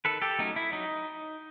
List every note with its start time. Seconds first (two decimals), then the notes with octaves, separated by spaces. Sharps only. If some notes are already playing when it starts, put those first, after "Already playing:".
0.05 D#3 A4 B4
0.22 G4 A4
0.39 F#3 A3 C#4 D#4
0.56 E4
0.72 F#3 D#4